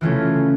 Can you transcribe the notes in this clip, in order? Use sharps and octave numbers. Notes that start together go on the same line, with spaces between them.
C#3 E3 A3 C#4 F4